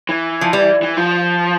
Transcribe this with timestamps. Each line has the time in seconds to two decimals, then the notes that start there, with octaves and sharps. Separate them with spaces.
0.09 E3
0.41 F3
0.53 G3
0.82 E3
0.97 F3